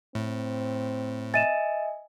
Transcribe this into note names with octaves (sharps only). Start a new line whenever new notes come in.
A2 C4
D#5 E5 G#5 A6 D#7 E7